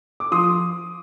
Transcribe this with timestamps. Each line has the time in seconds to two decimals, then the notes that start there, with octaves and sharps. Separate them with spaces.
0.20 D6
0.32 F3 C6 D#6